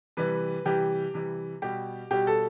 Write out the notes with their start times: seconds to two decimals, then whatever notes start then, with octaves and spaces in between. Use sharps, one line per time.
0.17 C3 E3 G3 B4
0.66 C3 E3 G3 G4
1.14 C3 E3 G3
1.62 B2 G3 G4
2.11 B2 G3 G4
2.27 A4